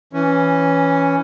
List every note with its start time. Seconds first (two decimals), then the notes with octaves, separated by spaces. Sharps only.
0.13 E3 C#4